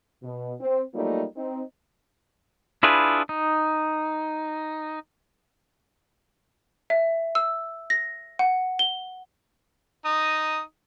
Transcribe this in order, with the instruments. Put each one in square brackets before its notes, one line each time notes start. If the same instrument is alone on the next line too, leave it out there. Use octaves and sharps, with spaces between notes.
[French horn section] B2
C4
F#3 G3 A3 A#3 D#4 F4
C4 D#4
[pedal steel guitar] D4 E4 F4 G#4 B4
D#4
[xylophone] E5
E6
A#6
F#5
G7
[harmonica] D#4 D#6